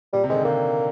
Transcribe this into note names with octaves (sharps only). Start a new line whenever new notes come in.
A#2 G3
C3
D#3 G#3
D3
D3 A#3